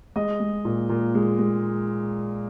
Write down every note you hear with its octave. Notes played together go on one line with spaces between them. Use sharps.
G#3 D#5 D#6
G#3
A#2
A#2
G#3
G#3